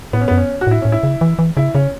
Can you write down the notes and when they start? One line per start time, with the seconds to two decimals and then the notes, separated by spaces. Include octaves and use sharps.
0.13 A2 B3
0.21 C#4
0.28 B3
0.31 F#2
0.37 C#4
0.61 F#4
0.67 A2 E4
0.82 A2 C#4
0.92 E4
1.03 C#3
1.21 E3
1.39 E3
1.57 C#3 E4
1.74 C#3 C#4